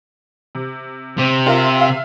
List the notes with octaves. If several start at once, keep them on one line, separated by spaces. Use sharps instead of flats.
C3
C3
F4 A#4 E5
E5 F5